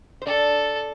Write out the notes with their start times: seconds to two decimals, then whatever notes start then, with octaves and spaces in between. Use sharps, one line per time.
0.22 C5
0.26 D4 A4 D5